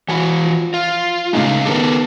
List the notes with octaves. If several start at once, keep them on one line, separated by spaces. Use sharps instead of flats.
E3 F#4 G#5 B5
F3
F4
C#3 G#3 A3 D#4 G#4 F5
D#3 B3 G4 A4 A#4